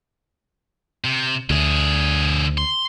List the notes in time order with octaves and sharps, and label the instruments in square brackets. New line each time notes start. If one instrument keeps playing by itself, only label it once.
[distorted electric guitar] C3
[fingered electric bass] D2 [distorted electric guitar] D3 G#4
[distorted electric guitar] C6